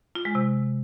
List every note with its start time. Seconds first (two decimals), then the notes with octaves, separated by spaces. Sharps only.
0.15 F4
0.25 G#3
0.35 C3